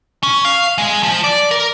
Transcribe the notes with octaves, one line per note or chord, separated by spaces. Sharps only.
C#4
F5
G#3
F3
D5
A#4